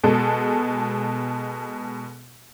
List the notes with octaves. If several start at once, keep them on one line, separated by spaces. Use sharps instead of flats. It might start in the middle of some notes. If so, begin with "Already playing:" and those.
B2 G#3 A4